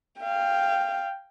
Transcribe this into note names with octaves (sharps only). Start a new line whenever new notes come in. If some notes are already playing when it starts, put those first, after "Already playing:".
F5 G5